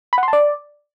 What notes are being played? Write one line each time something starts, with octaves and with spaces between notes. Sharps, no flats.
B5
F#5
C6
A5
D5